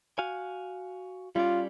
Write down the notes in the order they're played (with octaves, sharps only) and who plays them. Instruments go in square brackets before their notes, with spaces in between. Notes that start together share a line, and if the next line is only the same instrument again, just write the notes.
[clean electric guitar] F#4 F5 G#5
[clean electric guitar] G3 C#4 D5 [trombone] F4